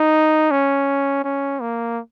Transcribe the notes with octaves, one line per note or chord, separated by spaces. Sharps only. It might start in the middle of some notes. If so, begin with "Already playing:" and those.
Already playing: D#4
C#4
C#4
A#3